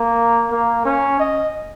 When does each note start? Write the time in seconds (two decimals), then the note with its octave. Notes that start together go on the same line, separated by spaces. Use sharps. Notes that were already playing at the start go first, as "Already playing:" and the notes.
Already playing: A#3
0.51 A#3
0.86 C#4
1.20 D#5